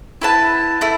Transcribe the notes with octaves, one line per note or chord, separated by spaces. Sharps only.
E4 B4 F#5 A5
A3 E4